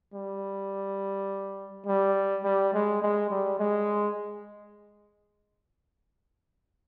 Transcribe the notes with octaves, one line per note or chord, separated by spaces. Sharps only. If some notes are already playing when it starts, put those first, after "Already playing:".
G3
G3
G3
G#3
G#3
G3
G#3